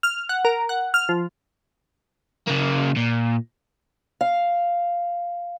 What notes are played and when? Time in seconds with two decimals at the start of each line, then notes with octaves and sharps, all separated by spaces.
0.03 F6
0.29 F#5
0.45 A#4
0.69 F#5
0.94 F6
1.09 F3
2.48 C#3 A#3
2.96 A#2
4.21 F5